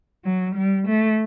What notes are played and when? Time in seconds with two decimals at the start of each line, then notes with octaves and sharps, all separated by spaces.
0.25 F#3
0.56 G3
0.88 A3